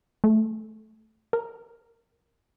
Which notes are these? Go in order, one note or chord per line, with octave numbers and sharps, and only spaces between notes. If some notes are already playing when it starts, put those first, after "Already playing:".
A3
A#4